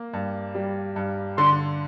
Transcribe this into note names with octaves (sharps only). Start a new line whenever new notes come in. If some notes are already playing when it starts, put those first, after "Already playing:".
Already playing: A#3
G2
G3
G2
D3 C6